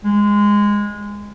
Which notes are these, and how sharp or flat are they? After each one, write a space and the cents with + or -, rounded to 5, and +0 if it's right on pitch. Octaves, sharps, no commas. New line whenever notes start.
G#3 -15